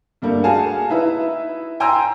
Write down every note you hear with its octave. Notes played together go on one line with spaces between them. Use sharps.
G2 G3 A3 A#3
F#4 G#4 F5 G#5 A5
D#4 E4 B4 E5
G5 G#5 A#5 C6 E6